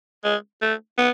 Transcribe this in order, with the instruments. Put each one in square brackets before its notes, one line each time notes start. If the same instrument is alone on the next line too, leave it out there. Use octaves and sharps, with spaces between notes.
[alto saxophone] G#3
A3
B3